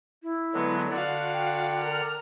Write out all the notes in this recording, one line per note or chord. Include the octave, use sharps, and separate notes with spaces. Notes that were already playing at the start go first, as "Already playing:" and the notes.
E4
D3 F#3 G#3 B3
D3 F#4 D5 F5 F#5
G5
A#4 F6